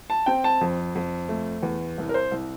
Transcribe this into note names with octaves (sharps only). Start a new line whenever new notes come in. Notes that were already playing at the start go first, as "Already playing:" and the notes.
A5
C4 G5
A5
F2
F2
A3
E2
C2
A#4
C5
C2